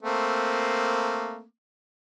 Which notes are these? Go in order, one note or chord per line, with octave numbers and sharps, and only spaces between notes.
A3 A#3 C4